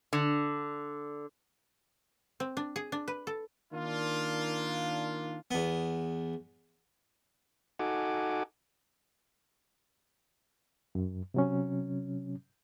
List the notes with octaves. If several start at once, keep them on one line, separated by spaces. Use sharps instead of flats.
D3
C4
D4
G#4
D4
B4
A4
D#3 A#3 D4 F4
E2 B3
D#4 F#4 A4 F#5 G#5 D6
F#2
C3 F#3 C#4